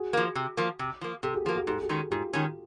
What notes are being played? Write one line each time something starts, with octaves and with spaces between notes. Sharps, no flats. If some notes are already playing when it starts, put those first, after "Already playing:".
Already playing: F#4 G#4
F3 A#3
C3
F3 A#3
C3
F3 A#3
C3 G4 A4
F#4 G#4
F3 A#3 F#4 G#4
F#4 G#4
G#2 G4 A4
F#4 G#4
D#3 G#3 C#4
G#2 F4 G4
D#3 G#3 C#4